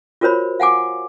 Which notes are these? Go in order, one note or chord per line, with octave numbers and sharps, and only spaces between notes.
F4 F#4 A#4 C5 C#5 B5
F5 F#5 G#5 D6